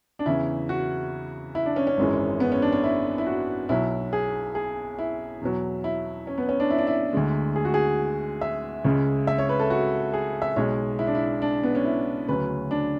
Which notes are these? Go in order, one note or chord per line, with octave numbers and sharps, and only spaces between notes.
D4
E2 C#3 E3 E4
F#4
E4
D4
C#4
C#4
G#1 F#2 E3 G#3
B3
C#4
D4
C#4
E4
E4
F#4
B1 B2 F#3 E4
G#4
G#4
E4
E2 B2 F#3
E4
C#4
B3
C#4
D4
E4
D4
E4
D2 D3 G#3
G#4
F#4
G#4
E5
C#2 C#3 G#3
E5
C#5
B4
A4
F#4
G#4
E5
B1 B2 G#3 C#5
E4
D4
E4
D4
B3
C#4
E4
D2 C#3 F#3 B4
D4